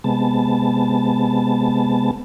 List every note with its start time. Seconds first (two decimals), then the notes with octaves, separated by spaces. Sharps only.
0.04 C3 G#3 B3 A5